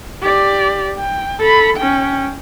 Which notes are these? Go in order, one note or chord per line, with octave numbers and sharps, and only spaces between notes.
G4 D5
G5
A4 B5
C#4 G5